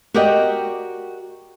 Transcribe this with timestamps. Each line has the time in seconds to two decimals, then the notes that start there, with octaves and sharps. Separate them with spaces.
0.14 F#4 G4 A#4 D5 D#5 G5